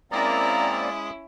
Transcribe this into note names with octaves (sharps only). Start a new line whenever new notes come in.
G#3 A#3 C4 C#4 E4 D5 A#5 D#6